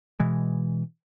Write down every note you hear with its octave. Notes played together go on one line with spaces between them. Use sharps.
B2 E3 G#3